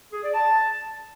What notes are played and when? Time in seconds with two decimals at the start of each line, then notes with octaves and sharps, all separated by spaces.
0.13 G#4
0.23 D5
0.34 A5